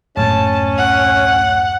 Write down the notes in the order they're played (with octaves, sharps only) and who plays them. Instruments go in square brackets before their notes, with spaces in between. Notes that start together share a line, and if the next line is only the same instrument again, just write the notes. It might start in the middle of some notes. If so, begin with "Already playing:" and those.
[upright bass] D1 [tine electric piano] F#2 [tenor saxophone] C#4 [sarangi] A5
[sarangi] F#5